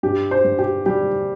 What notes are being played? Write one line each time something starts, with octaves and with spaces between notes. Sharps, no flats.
G2 G4
C5
G2
G4
G3 G4